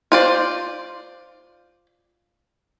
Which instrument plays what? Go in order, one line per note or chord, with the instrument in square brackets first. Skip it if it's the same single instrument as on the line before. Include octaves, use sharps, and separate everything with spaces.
[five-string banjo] F4 C5 D5